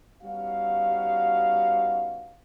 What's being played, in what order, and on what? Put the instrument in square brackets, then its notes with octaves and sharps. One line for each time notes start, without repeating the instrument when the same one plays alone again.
[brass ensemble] G3 B3 C#4 D#4 F#4 F5